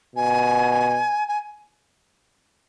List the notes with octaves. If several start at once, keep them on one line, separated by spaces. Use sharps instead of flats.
B2 G#5
G#5